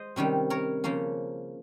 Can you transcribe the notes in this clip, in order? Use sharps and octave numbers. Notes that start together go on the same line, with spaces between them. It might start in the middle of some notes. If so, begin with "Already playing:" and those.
Already playing: G#3 C5 D#5
C3 D#3 G3 C#4
A#4 C#5
C#3 F3 A#3 C#4